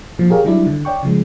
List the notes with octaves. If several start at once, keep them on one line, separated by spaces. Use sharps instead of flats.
A#2 F3
G4 G#4 A#4 C#5 F5
D#3 F#3 G3 D4 E4 D5
D3
C#5 D5 G5 C#6
C#3 F3 G#3